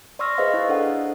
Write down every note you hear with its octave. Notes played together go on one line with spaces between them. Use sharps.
D5 C6 C#6 E6 F6 A#6
G#4 B4 C5 D#5 F5
E4
D4 A4 D#5 F#5